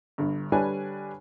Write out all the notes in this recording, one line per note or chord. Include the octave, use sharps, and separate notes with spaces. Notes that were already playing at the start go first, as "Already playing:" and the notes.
G1 G2
D3 G3 D4 B4 C#5 G#5